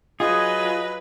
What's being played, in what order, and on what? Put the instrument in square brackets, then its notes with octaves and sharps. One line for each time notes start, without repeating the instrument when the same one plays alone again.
[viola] F#3 B4 [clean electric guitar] F4 [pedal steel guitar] G#4 [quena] D#5